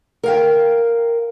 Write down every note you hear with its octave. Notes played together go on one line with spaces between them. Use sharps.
A#4 F5 G5